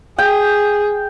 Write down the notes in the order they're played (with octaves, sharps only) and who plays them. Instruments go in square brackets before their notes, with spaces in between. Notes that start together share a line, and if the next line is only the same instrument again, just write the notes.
[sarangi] G#4 [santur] G5